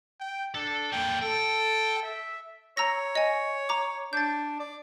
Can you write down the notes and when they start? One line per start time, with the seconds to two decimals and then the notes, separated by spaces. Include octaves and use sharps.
0.20 G5
0.55 D4 A4
0.92 D3 A#3 G5
1.21 A4 G5
2.03 E5
2.77 C#5 A#5 E6 A#6
3.15 D#5 G#5
3.69 A#5 D6
4.13 D4 G6 A6
4.60 D5